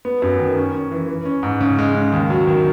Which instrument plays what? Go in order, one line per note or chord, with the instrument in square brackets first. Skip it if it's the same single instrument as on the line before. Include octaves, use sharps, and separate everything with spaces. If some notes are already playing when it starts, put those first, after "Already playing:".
[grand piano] B3
F#2
D#3
C#4
C#4
E3
E3
C#4
G#2
C#3
G#3
C#3
D#2
F#3
D#3